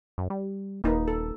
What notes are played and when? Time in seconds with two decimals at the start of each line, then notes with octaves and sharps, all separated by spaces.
0.18 F#2
0.30 G3
0.84 D#1 A#3 D#4 B4
1.08 A4